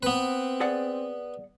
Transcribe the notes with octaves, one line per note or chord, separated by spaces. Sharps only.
B3 C4 B4
G#4 D5 F#5